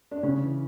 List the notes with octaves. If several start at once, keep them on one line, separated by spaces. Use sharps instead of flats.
D4
C#3 C#4
E3